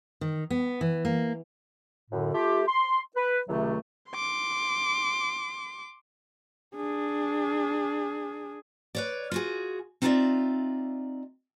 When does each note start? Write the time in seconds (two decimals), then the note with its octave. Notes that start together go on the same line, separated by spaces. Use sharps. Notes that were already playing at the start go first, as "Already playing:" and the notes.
0.21 D#3
0.50 B3
0.81 E3
1.05 A#3
2.11 F#2 A2 D3
2.34 A3 F4 G4
2.67 C6
3.16 B4
3.48 C#2 A2 C3 D#3 F#3 A3
4.11 C6 D6
6.76 D4 G#4
8.95 B4 C#5 D5
9.32 F4 F#4 G#4
10.02 C4 D#4 F4 C5 D5 E5